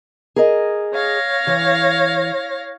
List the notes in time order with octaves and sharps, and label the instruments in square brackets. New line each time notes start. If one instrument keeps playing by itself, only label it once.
[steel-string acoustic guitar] G#4 A#4 D#5
[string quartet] C#5 F5 A#6
[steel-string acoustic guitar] E3